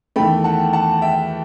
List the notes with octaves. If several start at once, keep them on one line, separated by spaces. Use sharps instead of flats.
E2 D#3 A3 G5 B5
F#5 A5
F#5 A5
E5 G5